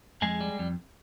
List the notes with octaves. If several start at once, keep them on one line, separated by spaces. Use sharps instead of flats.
F2 G#3 G#4
G3
F2